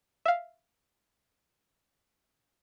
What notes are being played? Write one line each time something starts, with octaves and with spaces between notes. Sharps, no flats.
E5 F5